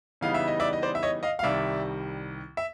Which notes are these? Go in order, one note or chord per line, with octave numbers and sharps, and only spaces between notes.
C#3 E3 G3 B3 D#4 F5
E5
D#5
D5 E5
D#5
C5 D5
E5
C#5 D#5
D#5 F5
F5
C2 C3 D#3 G3 D5 E5
E5